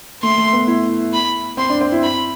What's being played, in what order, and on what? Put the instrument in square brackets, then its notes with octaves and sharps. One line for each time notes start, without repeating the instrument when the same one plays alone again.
[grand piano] A3 [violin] C6
[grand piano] A3
B3
E4
[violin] B5
[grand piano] C4 [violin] C6
[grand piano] D4
C4
E4
[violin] B5